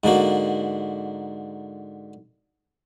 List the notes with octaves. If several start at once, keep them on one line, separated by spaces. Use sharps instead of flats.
G#2 D3 A#3 F#4